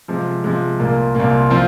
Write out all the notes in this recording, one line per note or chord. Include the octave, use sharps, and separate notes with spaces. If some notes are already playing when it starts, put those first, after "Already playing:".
C3 F3 G#3
C3 F3 G#3
C2 A#2 A#3
C2 A#2 A#3
F3 C4 F4